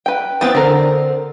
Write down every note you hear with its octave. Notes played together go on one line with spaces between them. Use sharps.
B4 G5
E3 B3 C4 G5 D#6 A6
D3 C4 A#4